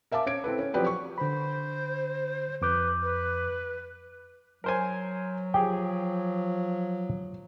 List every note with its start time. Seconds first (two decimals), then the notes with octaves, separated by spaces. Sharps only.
0.11 A#4 E5 F5 A5 D6
0.26 C#4 G#6 D7
0.44 C4 E4 A4 B4
0.59 C#4
0.74 F3 F#3 C4 G4 B4 D5
0.86 C#6
1.18 D3 C5 B5
2.62 F2 B4 D6 G6
3.02 B4
4.64 F#3 A#4 C5 G#5
5.54 F3 G4 G#4 G5